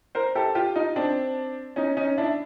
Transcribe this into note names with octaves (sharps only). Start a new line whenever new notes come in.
A#4 C5
G4 A4
F4 G4
D#4 F4
C4 D4
C#4 D#4
C#4 D#4
D4 E4